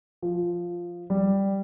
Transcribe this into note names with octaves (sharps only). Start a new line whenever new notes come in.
F3
G3